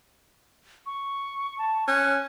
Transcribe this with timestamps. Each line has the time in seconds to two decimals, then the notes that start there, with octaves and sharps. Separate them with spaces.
0.86 C#6
1.59 A5
1.88 C#4 F#6